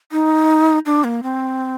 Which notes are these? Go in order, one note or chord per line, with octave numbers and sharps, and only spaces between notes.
D#4
D4
A#3
C4